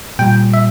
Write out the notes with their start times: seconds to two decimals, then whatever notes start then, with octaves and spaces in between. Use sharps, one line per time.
0.19 A#2 G3 G5
0.54 E5